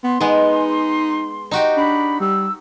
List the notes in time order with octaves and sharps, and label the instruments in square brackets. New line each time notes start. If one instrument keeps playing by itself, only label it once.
[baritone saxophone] B3 [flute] C6
[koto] G#3 B3 [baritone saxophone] D#4
[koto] D#4 F#4 G4
[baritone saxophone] D4 [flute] B5
[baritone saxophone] G3 [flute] E6